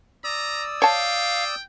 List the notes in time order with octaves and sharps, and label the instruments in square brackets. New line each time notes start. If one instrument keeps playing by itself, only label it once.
[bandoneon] D5 D#6 E6 [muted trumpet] A#5
[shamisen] C#5 A5 [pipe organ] F5 [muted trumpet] G5